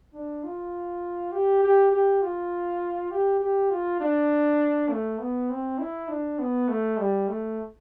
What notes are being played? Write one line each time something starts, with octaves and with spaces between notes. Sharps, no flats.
D4
F4
G4
G4
G4
F4
G4
G4
F4
D4
A3
B3
C4
E4
D4
B3
A3
G3
A3